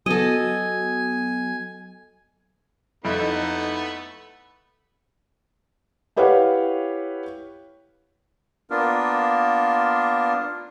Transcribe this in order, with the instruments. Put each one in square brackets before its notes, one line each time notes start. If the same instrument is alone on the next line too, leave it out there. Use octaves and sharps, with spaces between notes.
[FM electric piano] F#3 B3 F#4 [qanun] A4 D#5 [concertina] G#5
[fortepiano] F2 E4 [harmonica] A3 B3 B5 [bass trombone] D#4
[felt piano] E4 G4 B4 C#5 F5 F#5
[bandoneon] A#3 B3 D4 F4 A#4